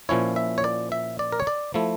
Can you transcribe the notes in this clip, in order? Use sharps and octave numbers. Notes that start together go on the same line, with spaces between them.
A#2 F3 C#4 E4 C#5
E5
C#5
D5
E5
D5
A#4
C#5
D5
F3 A3 E4